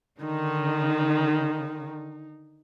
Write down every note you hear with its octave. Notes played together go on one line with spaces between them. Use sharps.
D3 D#3 D#4